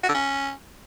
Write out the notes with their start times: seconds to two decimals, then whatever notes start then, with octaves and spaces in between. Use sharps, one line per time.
0.03 F#4
0.09 D3
0.14 C#4